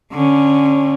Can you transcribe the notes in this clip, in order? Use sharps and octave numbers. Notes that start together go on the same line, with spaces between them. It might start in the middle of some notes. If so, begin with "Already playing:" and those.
D3 C#4